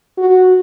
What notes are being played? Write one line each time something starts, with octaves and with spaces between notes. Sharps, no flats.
F#4